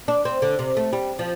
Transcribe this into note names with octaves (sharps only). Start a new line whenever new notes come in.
D4
C4
D3
C3
A3
G3
F3